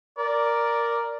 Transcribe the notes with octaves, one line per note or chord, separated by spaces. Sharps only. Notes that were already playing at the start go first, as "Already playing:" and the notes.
A#4 D5